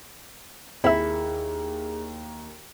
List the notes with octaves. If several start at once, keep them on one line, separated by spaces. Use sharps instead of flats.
D#2 C4 E4 G#4 E5